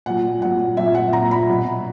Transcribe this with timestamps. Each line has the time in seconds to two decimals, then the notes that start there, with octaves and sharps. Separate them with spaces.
0.06 A#2 F#3 F#5
0.42 A#2 F#3 F#5
0.77 A#2 F#3 E5
0.95 F#5
1.12 A#2 F#3 A#5
1.31 B5
1.49 B2 F#3